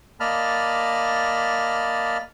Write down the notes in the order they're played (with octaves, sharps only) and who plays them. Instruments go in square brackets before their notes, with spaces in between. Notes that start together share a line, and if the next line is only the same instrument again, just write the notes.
[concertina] A#3 D5 D#5 A5 B5 F6